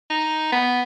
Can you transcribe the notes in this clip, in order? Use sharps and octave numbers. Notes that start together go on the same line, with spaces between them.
D#4
B3